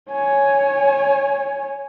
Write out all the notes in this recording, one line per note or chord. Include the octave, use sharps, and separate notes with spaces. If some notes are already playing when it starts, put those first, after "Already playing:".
C#5 G#5